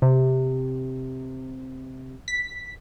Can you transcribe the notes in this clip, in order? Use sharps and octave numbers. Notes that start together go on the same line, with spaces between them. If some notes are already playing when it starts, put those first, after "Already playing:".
C3
B6